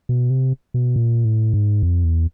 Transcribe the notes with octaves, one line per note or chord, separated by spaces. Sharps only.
B2
C3
B2
A#2
A2
G#2
F2
E2